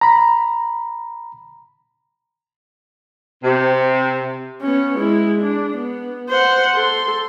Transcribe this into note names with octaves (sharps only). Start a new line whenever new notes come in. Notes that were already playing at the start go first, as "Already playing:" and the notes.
A#5 B5
C3
B3 C#4
G#3 E4
D4
B3
C5 F#5
A4 C6